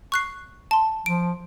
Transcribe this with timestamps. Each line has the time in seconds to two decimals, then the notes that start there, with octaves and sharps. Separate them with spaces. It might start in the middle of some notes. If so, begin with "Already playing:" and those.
0.12 C#6 F#6 C7
0.71 A5 C6
1.06 F3 D7